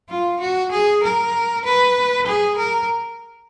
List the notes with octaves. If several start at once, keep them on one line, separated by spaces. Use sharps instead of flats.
F4
F#4
G#4
A#4
B4
G#4
A#4